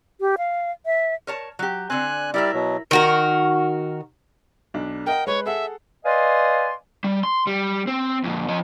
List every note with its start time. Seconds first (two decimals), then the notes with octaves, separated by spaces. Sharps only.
0.21 G4
0.38 F5
0.86 E5
1.27 A#4 C#5 A5
1.59 F#3 G4
1.90 D3 C4 G#5 F#6
2.34 G3 E4 A#4 D5 E5
2.54 B2 F#3
2.91 D#3 F#4 A#4
4.74 B1 D4
5.06 A#4 D#5 F#5 G5
5.27 G#3 B4 C#5
5.46 G#4 A4 E5 F#5
6.06 B4 D5 D#5 F5 G#5 C6
7.04 G3
7.23 C6
7.47 G3
7.87 C4
8.24 F2 A#2
8.48 F3 D#5